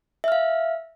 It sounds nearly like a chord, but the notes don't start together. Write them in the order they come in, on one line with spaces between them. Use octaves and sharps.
E5 F6 F5